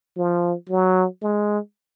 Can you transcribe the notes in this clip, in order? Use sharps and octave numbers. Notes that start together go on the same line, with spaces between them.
F3
F#3
G#3